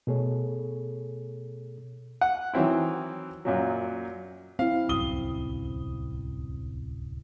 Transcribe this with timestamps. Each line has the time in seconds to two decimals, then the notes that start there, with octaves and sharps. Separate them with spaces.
0.07 B2 A3 G#4 A4 C#5
2.21 F#5
2.54 D#3 E3 F#3 C4 E4
3.45 F#2 A#2 F#3
4.59 C4 E4 F5
4.89 D1 C2 F#2 D#6 G7